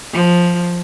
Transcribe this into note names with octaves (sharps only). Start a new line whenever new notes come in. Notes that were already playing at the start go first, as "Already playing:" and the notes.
F3